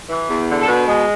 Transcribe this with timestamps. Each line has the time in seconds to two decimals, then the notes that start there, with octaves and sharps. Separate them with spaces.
0.09 E3
0.29 E2
0.49 D3
0.62 A4
0.67 B2 B4
0.87 G#3